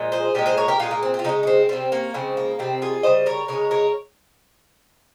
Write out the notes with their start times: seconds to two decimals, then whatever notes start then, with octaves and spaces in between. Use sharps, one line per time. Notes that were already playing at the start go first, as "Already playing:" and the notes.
Already playing: A#2 F3 G#3
0.12 G#4 C5
0.34 A#2 G#3 G4 A#4
0.46 G#4 C5
0.57 A#4 C#5
0.68 G4 A#4
0.79 A#2 G#3 F4 G#4
0.91 A#3
1.03 C4
1.14 C4
1.19 F4
1.24 C#3 G#3 C4 D#4
1.43 C#4
1.47 C4
1.69 C3 G3 C4
1.92 A#3 C#4
2.14 C#3 F3 G#3 C4
2.37 A#3
2.59 C3 D#3 G3 C4
2.82 F4 G#4
3.03 C#3 G3 C5 D#5
3.26 A#4 C#5
3.48 C#3 G#3 A#4 C#5
3.71 A#4 C#5